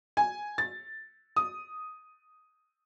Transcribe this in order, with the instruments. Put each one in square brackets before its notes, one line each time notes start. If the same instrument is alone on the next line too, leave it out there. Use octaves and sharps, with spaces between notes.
[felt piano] G#5
A6
D#6